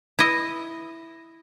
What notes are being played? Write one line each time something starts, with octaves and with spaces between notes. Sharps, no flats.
E4 D#5